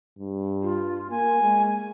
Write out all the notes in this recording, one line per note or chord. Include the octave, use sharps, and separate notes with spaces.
G2
F4
A#3 G#5
G#3